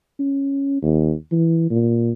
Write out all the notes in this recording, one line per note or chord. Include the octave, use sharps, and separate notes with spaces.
C#4
D#2
E3
A#2